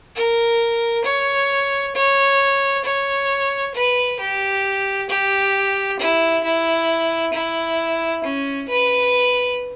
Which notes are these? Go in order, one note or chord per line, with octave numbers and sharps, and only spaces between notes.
A#4
C#5
C#5
C#5
B4
G4
G4
E4
E4
E4
C#4
B4